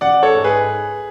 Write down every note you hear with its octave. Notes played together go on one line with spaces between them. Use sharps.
A1 D5 F#5
A4 C#5
G#2 G#3
G#4 B4